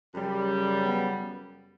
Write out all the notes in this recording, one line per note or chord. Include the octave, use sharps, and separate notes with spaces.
F#2 C#3 G3
B3